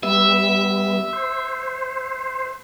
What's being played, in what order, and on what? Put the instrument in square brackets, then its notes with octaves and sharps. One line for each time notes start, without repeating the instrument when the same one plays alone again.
[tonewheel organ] G3 B3 [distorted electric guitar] E5
[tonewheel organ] C5